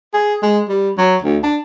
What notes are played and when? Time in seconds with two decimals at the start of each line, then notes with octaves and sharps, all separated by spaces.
0.14 G#4
0.43 G#3
0.69 G3
0.98 F#3
1.22 D2
1.43 D4